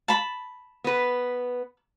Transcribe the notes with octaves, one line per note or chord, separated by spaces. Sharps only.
A5 B5
B3 B4